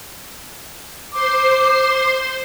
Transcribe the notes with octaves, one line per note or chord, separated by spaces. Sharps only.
C5 C6 D6